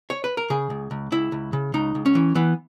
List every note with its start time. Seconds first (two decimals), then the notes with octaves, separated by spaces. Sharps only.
0.10 C#5
0.24 B4
0.37 A#4
0.50 C#3 G#4
0.70 C#2
0.91 C#2
1.12 C#2 E4
1.32 C#2
1.53 C#3
1.74 C#2 D#4
1.95 C#2
2.06 C#4
2.15 E3
2.35 E3 B3